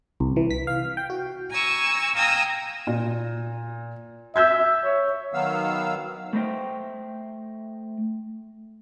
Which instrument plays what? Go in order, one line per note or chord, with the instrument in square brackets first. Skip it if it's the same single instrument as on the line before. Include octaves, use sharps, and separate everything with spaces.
[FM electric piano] C2
E3
B6
F5
G5
F#4
[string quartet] G#5 A#5 C#6 E6
F5 G5 G#5 A#5 D#6 E6
[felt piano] A#2
[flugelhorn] E5 [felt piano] E6 G6 G#6
[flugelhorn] C#5
[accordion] D#3 F#3 B3 F5 E6
[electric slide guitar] A3 C5 D#5 G5